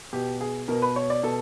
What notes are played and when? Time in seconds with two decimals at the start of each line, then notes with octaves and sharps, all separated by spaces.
0.13 B2 G4
0.41 G#4
0.68 B2 A#4
0.82 B4
0.96 C#5
1.10 D5
1.23 B2 A4